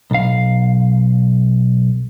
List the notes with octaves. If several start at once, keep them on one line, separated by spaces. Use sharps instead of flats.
B1 F5